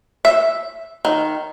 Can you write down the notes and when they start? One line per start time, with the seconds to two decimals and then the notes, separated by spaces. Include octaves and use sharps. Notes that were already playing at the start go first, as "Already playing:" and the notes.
0.25 E5
1.05 D#3